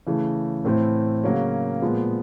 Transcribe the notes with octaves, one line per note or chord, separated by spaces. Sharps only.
C#3 E3 A3
A2 E3 A3 C4 E4
C#3 F#3 A#3 C#4 F#4
A#2 F3 G#3 B3